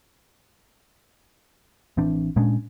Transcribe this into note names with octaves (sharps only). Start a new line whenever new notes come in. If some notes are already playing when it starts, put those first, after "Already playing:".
A1 E3 C4 D4
A#2 G#3 C#4 D4